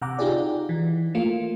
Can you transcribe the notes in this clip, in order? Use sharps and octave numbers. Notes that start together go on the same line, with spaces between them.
C3 F#5 A#5 D6
D#4 F4 G4 G#4 D5
E3
A3 A#3 F4